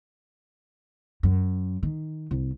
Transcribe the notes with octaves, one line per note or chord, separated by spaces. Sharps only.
F#2
D#3
C2